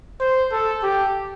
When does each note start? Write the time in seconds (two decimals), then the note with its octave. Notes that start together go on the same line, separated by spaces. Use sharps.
0.20 C5
0.52 A4
0.83 G4